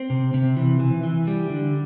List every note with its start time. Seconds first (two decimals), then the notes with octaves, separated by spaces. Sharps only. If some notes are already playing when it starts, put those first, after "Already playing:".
Already playing: C4
0.10 C3
0.34 C3
0.57 E3
0.80 E3
1.03 E3
1.27 G3
1.50 D3